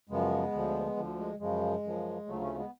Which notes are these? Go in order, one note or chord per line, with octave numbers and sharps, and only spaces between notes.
F#2 C#3 F3 G#3 B3
D2 D3 F3
D2 D3 F3
G#3
F#2 C#3 F3 G#3
F#2 C#3 F3
D2 C#3 F3 F#3 A3
A3 C#4
G#3 B3